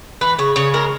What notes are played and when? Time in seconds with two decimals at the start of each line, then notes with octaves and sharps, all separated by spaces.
0.21 E3 B4
0.38 C#3 C#5
0.56 C#3 C#5
0.74 G#3 A#4